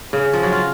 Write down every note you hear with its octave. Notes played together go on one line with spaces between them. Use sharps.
C#3
F3
F#3
F4